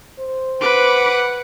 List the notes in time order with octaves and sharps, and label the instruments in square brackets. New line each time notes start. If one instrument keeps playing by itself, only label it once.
[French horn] C5
[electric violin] B4 D6 [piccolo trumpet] F#5